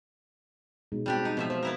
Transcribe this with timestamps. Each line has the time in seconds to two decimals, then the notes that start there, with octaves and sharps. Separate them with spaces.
0.92 B2 G#3 D#4
1.06 G3 C4 D4 F#4 G4
1.25 B3 D#4
1.37 B2 F3 F#3 E5
1.50 F3 C5
1.63 B3 E4 A#4